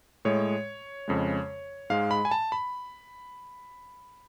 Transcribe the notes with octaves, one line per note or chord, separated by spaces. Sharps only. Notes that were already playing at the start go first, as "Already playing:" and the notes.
A2 G#3 C#5
F2 C#3 G#3
G#2 G#3 F5
B5
G#5
A5
B5